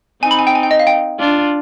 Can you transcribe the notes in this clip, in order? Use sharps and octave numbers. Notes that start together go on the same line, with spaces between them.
C4 D#4 G#5
B5
G#5
G5
G#5
G5
D#5
F5
G5
D4 F4